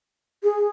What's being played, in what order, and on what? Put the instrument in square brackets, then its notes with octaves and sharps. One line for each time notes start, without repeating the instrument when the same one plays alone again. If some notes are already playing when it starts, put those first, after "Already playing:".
[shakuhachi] G#4